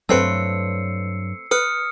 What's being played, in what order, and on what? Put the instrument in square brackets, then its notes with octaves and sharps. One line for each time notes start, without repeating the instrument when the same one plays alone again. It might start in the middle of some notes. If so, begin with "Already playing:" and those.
[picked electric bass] G2 F#3 [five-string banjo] A3 C4 B4 [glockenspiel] E6 C7 C#7
[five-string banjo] B4 [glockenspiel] D#6 F6 C#7